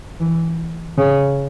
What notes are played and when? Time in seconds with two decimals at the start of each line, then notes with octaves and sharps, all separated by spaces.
0.20 E3
0.98 C#3